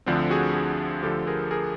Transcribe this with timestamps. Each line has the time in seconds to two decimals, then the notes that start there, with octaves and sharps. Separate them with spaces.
0.06 D2 D3 F3 C4 D4
0.30 F#4 G#4
0.54 F#4 G#4
1.03 D2 D3 F3 G4 A4
1.27 G#4 A#4
1.51 G#4 A#4